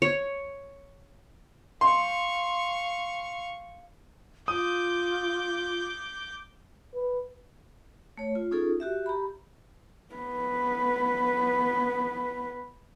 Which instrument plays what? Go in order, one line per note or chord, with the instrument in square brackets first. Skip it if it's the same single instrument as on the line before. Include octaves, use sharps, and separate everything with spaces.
[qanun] C#5
[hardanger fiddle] F5 C#6 [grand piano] C6
[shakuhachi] F4 [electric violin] D6 G6 [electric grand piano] D#6
[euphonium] B4
[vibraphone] A3 C#5
F4
C#4 D#4 F4 G#4 A4
F#4 G4 E5
G4 A#5 B5
[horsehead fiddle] B3 B4